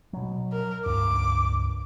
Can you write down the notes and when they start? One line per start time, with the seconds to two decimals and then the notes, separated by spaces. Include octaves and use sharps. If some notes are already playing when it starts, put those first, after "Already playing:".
0.13 B2 F#3
0.52 A#4
0.86 C#2 G2 D6